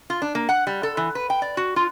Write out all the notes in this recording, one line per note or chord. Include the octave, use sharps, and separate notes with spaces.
F4
D4
A#3
F#5
G3
A4
E3
B4
G5
D5
F#4
F4